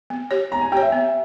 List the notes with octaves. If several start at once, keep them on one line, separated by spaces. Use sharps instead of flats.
B3
G4 C#5
B3 A#5
G#5
G4 C#5 G5
E5
B3